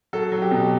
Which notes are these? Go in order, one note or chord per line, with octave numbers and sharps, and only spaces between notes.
F#3 A4
F#3
G4
B2